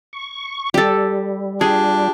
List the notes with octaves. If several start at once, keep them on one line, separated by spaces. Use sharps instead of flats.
C#6
G3 G4 A4
D4 F4 G4 G#4